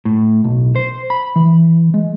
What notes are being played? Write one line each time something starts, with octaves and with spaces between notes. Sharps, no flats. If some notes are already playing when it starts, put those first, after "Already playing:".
A2
B1
C5
B5
E3
G#3